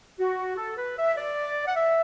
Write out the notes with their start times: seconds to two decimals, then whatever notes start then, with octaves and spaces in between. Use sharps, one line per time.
0.19 F#4
0.57 A4
0.77 B4
0.97 E5
1.16 D5
1.67 F#5
1.75 E5